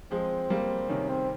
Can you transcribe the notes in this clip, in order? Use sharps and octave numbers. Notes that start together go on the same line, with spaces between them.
F3 G#3 C4
G3 A#3
C3 D#3 C#4
C4